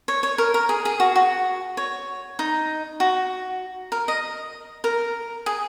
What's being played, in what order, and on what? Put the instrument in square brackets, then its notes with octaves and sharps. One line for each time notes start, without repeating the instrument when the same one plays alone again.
[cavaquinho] C#5
C#5
A#4
A#4
G#4
G#4
F#4
F#4
C#5
D#4
F#4
A#4
D#5
A#4
G#4